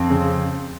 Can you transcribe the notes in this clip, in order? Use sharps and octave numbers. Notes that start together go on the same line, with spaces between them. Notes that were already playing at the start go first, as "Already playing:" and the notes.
Already playing: F2 C4
C#3